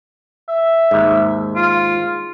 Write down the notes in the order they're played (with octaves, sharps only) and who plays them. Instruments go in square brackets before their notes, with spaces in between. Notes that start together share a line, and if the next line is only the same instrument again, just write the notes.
[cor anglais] E5
[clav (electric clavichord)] D#2 G#2
[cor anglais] F4